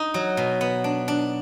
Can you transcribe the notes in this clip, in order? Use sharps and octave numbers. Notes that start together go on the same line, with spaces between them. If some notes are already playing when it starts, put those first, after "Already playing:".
Already playing: D#4
F#3
B2
B3
D4
D4